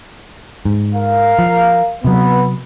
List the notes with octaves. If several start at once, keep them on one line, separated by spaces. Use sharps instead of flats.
G#2
A#4 F5
F3
C3 F#3 B3